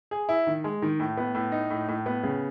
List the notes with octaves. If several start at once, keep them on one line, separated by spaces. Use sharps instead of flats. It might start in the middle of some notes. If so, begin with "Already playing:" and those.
G#4
E4
D#3
G#3
D#3
A2
B3
A2
D#4
A2
A2
B3
C#3